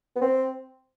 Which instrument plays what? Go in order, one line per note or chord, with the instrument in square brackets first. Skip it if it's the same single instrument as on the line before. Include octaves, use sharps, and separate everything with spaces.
[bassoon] B3
C4